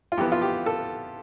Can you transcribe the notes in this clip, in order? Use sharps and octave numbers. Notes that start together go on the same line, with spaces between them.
F4
F2 E3 B3 G4
F4
G4
A4